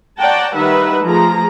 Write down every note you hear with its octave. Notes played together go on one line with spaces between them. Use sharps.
C#5 D5 F#5 G5 A5 A#5
D#3 G3 D#4 B4 E5 F#5
F3 A3 G#4 A#5